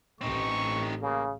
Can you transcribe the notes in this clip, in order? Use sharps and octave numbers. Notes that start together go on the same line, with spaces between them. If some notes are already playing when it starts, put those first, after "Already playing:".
A1 A2 C4 D#4 C#6
C#3 A#3